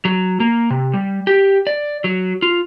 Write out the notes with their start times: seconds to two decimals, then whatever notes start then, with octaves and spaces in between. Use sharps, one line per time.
0.05 F#3
0.40 A#3
0.70 C3
0.93 G3
1.27 G4
1.67 D5
2.04 F#3
2.42 F4